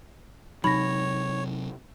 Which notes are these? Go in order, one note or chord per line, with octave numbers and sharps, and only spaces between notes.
C3 F#3 D#4 C#5 B5 A#6